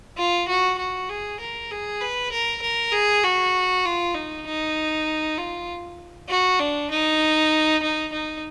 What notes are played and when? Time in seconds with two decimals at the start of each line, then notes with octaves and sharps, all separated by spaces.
0.17 F4
0.48 F#4
0.78 F#4
1.09 G#4
1.40 A#4
1.71 G#4
2.01 B4
2.32 A#4
2.62 A#4
2.92 G#4
3.24 F#4
3.85 F4
4.14 D#4
4.46 D#4
5.38 F4
6.29 F#4
6.59 D4
6.91 D#4
7.82 D#4
8.13 D#4